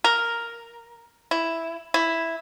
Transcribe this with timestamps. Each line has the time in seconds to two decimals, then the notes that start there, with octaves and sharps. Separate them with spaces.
0.04 A#4
1.31 E4
1.94 E4